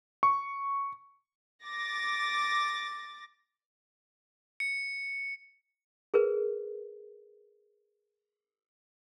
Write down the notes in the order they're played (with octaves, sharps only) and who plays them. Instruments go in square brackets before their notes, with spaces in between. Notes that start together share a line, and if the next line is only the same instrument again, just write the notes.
[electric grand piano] C#6
[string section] D6 A6 A#6
[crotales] C#7
[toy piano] G#4 A#4 B4